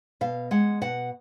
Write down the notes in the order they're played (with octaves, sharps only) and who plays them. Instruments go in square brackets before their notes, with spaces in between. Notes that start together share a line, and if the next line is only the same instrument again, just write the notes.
[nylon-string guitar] B2 F5
G#3 F#5
B2 F#5